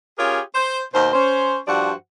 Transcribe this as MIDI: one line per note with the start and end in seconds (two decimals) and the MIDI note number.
0.18 0.40 61
0.18 0.40 65
0.18 0.40 67
0.18 0.40 68
0.18 0.40 70
0.18 0.40 73
0.55 0.80 72
0.94 1.09 39
0.94 1.09 47
0.94 1.09 72
1.14 1.59 61
1.14 1.59 72
1.67 1.93 43
1.67 1.93 53
1.67 1.93 66
1.67 1.93 72
1.67 1.93 74
1.67 1.93 78